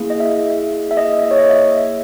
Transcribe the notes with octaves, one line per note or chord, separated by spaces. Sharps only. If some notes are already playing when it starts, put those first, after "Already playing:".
Already playing: A#3 E4 G#4
D#5
E5
E5
D#5
D#5
C#5
D#5
E5